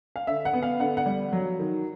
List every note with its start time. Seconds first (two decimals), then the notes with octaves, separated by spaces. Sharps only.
0.16 F5
0.27 D3 E5
0.45 F#5
0.53 B3
0.63 F5
0.80 D3 F#5
0.97 F#5
1.06 G3
1.33 F#3
1.59 D#3